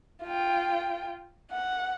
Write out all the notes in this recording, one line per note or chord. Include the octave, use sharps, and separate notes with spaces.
F4 G5
F#5